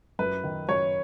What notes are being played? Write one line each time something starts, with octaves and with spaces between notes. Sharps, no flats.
F#2 B4
D#3
F#2 C#5